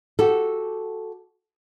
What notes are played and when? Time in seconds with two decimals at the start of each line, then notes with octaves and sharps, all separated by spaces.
0.19 F#4 G4 A4